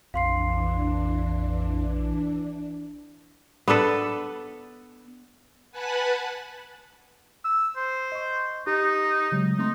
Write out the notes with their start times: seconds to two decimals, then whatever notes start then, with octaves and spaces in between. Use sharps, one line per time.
0.14 A#1 F2 E3 D4 F5 C6 C7
3.68 B3 D4 A4 B4
5.71 B4 F#5 G#5 A5 B5 F#6
7.45 E6
7.77 C5
8.12 D#5 C#6
8.67 D#4 G4
9.32 C#3 F#3 G#3
9.59 A3 C4 D#4 C6